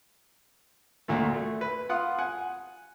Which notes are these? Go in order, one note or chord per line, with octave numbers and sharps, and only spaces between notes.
D2 A#2 A3
A3
B4
F4 F#5 D#6
F#5 G#5